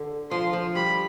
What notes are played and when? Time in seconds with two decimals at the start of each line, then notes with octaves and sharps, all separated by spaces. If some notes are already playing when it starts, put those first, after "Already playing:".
Already playing: D3
0.31 F3 C6
0.53 F3
0.75 G3 B5